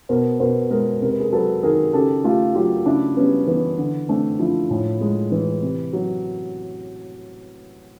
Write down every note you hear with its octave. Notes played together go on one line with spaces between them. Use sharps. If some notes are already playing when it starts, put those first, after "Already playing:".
B2 A#4 C5
B2 A#4 C5
G#3 G#4 A#4
C3 A#4
B4
G#4 A#4
F#3 A4 B4
D#3 G#4 A#4
C#3 G4 A4
A3 F4 G4
F#3 F4 G4
C#3 D4 E4
G3 B3 C#4
E3 B3
D3
A3 C4 D4
F3 D4 E4
A2
G#3
E3
C3
F#3